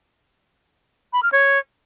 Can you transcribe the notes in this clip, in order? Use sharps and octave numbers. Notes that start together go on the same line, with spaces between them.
B5
F6
C#5